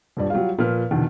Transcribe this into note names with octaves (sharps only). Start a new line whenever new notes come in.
D#1 G2 D5
F#3 G3 F4 F5
A#2 F3 B4 F6
E2 B2 D3 D#3